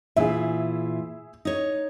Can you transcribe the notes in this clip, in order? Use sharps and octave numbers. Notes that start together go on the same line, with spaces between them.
A#2 E3 G#4 E5
D#4 C#5